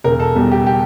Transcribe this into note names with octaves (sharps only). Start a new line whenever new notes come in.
E1 A#4
A4
E2 B2 G3
G4
G4